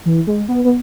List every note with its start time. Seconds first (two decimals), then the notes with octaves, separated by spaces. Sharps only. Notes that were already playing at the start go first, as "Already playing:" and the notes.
0.05 E3
0.27 G#3
0.48 B3
0.64 B3